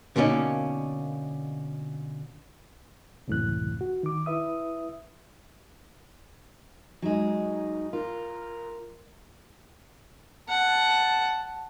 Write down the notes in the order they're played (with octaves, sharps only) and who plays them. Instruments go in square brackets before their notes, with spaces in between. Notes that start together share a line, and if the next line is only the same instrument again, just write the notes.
[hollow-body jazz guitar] B2 D3 A#3 C#4 D#4
[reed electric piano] C#2 F#2 A2 C3 E3 F#6
F#4
D#3 D6
E4 B4 E5 D#6
[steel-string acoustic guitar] F#3 G#3 [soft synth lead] D#4
[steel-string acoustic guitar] F4 [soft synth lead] A#4
[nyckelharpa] F#5 [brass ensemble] A5